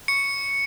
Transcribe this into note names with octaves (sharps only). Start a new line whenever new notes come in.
C#6 C#7